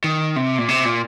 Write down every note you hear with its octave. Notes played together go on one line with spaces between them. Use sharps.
D#3
C3
A#2
C3
A#2